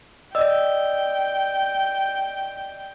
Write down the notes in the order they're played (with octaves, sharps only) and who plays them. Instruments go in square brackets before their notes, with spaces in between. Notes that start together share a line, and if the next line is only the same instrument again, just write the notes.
[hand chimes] D5 D#5 E6 [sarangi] G5